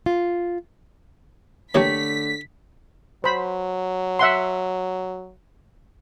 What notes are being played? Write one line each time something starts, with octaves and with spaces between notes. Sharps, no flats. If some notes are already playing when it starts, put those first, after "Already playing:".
F4
D3 E3 A3 A#3 G4 C#5 B6
F#3 C5 B5
E5 F#5 C6